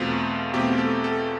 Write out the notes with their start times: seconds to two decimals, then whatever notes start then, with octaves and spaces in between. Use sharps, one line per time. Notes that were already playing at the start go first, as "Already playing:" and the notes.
Already playing: E2 B2 A3 C4 F4
0.53 E2 B2 A3 C4 G4
0.78 A4
1.04 A4